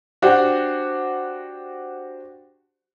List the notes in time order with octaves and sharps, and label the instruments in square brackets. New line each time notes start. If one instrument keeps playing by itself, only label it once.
[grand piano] D4 F#4 G4 C5 F#5